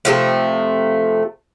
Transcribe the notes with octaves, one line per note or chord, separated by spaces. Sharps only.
C3 F3 A3